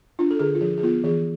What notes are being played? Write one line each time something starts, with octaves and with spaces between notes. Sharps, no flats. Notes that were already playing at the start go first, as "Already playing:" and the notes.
D4 F4
A4
D3 G#4
F4
F3 G#4
G#4
B3 F4
E3 G#4